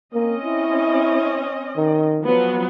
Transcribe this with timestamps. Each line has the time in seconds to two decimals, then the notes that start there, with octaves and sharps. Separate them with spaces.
0.14 A#3 C4 C#4 D#5
0.45 E4
1.77 D#3
2.23 F3 F#3 B3